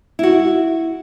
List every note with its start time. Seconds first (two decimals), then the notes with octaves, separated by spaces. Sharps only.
0.19 E4 F#4